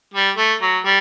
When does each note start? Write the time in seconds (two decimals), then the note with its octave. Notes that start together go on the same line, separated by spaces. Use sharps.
0.14 G3
0.37 A3
0.62 F#3
0.85 G3